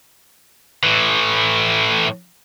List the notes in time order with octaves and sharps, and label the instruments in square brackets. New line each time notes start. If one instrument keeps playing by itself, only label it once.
[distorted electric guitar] A2 E3